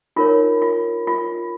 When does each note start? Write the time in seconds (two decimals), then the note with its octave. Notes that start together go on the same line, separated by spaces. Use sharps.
0.16 D#4 F4 A#4 C#5
0.62 F4
1.07 F4